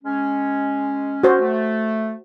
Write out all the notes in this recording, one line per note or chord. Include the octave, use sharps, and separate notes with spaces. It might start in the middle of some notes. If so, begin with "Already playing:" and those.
G#3 C#4
F#4 C5
A3